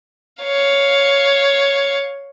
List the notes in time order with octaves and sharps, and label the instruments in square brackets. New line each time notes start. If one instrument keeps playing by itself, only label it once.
[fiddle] C#5 F5